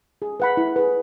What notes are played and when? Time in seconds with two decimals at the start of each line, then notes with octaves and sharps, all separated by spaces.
0.22 G#4
0.40 B4 F#5 B5
0.57 E4
0.76 G#4 B4